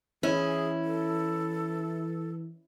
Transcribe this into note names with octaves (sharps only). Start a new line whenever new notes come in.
E3 C#4 E4 G#4
A4